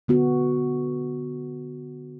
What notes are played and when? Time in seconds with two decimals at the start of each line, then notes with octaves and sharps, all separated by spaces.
0.08 D3 B3 F#4